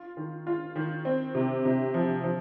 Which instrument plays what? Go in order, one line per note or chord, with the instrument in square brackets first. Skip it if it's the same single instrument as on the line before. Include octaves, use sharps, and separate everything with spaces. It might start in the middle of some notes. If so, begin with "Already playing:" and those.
Already playing: [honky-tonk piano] F4
D#3
F4
D#3
C4
C3
C3
F3
F3